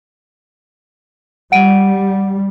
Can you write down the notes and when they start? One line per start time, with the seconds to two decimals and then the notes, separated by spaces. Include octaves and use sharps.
1.52 G3 F#5 D7 D#7